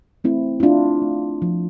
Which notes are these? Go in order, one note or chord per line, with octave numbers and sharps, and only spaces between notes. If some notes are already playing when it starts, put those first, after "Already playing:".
A3 C4 E4
E4
A3 D4 F4
A3
F3